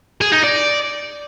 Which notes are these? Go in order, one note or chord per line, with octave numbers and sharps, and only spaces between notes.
G#4
D#4
D5